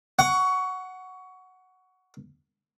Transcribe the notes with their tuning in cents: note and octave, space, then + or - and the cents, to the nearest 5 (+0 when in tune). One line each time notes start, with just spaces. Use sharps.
F#5 +0 C#6 +20